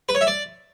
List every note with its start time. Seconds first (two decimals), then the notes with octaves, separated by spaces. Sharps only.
0.09 B4
0.15 C#5
0.21 E5
0.27 D5